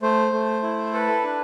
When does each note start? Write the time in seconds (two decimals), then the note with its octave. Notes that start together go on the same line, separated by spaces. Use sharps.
0.02 A3 C5
0.32 A3
0.63 E4
0.93 A4 B4
1.24 D4